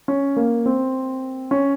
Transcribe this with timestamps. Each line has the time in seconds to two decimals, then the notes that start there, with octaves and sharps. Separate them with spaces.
0.08 C#4
0.36 A#3
0.66 C4
1.51 C#4